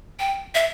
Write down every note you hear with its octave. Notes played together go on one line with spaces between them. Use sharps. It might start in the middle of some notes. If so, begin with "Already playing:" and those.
G5
E5